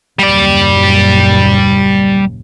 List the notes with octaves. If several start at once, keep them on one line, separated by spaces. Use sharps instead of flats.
F#1 D#2 A#2 G3 D5